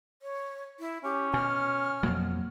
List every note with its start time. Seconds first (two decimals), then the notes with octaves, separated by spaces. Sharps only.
0.22 C#5
0.80 E4
1.04 C#4 G4
1.34 B2 G#5 F6
2.03 F2 B2 F#3 A#3